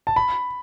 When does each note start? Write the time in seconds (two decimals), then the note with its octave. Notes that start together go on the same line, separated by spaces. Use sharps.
0.07 A5
0.16 B5